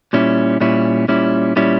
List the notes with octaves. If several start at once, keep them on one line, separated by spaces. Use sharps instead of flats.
A#2 G3 C#4 E4
A#2 G3 C#4 E4
A#2 G3 C#4 E4
A#2 G3 C#4 E4